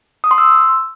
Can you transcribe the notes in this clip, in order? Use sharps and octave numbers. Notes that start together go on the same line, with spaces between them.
D#6
C6
E6